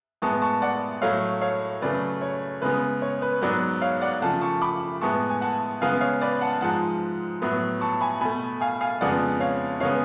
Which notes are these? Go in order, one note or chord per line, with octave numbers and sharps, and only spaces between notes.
A2 G#3 B3 A5 C#6
A5 C#6
D5 F#5
A2 F#3 A3 C#5 F5
C#5 F5
C#3 F#3 A3 B4 D5
C#5
C#3 G#3 B3 B4
C#5
B4
G#2 F#3 B3 B4 D5
C#5 F5
D5 F#5
C#3 F3 A3 F#5 A5
A5 C#6
B5 D6
A2 G#3 B3 A5 C#6
G#5
F#5 A5
C#3 G#3 B3 F5 G#5
C#5 F5
B4 D5
F#5 A5
G#2 F3 G#3 F#5 A5
A2 F#3 B3
A5 C#6
G#5 B5
B2 A3 G#5 B5
F5 G#5
F5 G#5
F2 C#3 G#3 B3 D5 F#5
C#5 F5
C#3 G#3 B3 C#5 F5